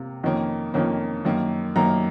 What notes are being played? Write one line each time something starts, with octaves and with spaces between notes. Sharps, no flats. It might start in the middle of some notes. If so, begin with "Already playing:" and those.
Already playing: C3 A#3 F4
F2 D#3 A#3 C#4
F2 D#3 A#3 C#4
F#2 D#3 A#3
F#2 D#3 A#3 A#5